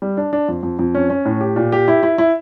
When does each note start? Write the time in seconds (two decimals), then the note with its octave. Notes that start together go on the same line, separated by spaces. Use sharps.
0.02 G3
0.17 D4
0.33 D4
0.48 F2
0.63 F2
0.79 F2
0.95 C#4
1.10 C#4
1.25 A2
1.41 G4
1.56 A#2
1.72 G4
1.88 E4
2.03 E4
2.18 E4